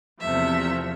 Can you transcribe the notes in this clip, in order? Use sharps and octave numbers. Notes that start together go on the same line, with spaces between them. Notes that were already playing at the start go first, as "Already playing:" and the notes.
E2 C3 F3 A3 E5